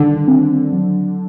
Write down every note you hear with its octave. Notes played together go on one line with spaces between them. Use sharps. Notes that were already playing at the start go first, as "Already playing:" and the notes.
Already playing: D3 D#3 G3
C4
F#3